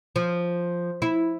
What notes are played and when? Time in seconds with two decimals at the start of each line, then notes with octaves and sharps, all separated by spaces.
0.16 F3
1.02 E4